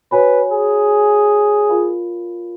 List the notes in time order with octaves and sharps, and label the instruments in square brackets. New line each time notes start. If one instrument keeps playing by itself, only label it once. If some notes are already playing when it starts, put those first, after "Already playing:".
[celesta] F#4 C#5 G#5 B5 [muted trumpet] B4
[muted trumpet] G#4
[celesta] F4 A#4 F5 B5